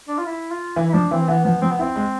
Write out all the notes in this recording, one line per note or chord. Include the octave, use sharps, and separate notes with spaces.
D4
F4
E4
F4
E3 E4
E4
F3 D4
E3 C4
E3 B3
F3 B3
F3 C4
B3
C4 E4
G#3